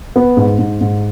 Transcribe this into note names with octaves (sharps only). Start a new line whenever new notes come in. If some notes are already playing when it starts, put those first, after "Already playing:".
B3
G#2
G#2
G#2